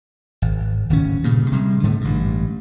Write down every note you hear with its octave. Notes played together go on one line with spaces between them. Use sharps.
G#1
D1 D#3 C#4
G2 A#2 C#3
C3 G3 G#3
G#2 D3 G#3 A3
A1 G2